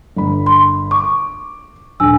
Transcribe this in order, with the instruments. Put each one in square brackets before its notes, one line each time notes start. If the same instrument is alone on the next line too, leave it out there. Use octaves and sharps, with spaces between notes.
[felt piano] G1 B5
[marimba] C6
[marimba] C#6 [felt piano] D6
[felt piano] D#1 [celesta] D4 G#5 E6